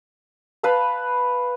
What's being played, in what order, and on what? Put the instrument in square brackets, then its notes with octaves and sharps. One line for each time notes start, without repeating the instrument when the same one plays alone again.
[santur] B4 F5 A5 B5